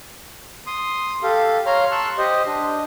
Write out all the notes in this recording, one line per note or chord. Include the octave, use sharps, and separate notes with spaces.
C6 D#6
G4 A4 F5
C#5 F5 A#5 C6 F6
A5 C6 C#6 E6 F#6
G4 C5 D#5
D4 D#5